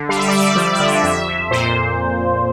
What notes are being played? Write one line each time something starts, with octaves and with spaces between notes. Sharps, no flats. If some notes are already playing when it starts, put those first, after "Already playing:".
Already playing: D3
G3 F5
E5
G3 D5
E5
F3 D5
E5
D3
E5
F2 E5
F2
A#2 C5